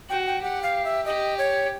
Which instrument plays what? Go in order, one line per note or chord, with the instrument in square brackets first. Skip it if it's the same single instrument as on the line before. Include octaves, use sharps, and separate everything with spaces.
[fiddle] F#4 [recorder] G5
[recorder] G5
[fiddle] G4 [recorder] F#5
[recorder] F5
E5
[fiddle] G4 [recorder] D#5
[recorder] C#5